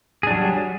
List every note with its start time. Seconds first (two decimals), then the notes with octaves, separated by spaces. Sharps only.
0.23 G#4
0.27 D4
0.31 F#3
0.34 G3